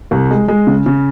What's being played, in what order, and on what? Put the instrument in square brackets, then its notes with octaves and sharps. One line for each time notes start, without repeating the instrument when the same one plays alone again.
[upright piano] C2
G#3
G#3
C#3
C#3